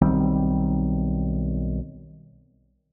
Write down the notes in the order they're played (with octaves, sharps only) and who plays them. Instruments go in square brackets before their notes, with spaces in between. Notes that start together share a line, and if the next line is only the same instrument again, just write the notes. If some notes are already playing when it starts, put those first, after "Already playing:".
[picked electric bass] B1 D#3 G3 C4